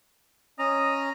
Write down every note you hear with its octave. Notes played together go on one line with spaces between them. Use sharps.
C#4 D#5 A#5